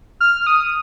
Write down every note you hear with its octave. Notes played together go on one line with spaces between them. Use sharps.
F6
D#6